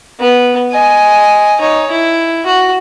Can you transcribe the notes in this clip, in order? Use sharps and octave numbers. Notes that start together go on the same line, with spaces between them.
B3
D#5 G#5
D#4 C#5
E4
F#4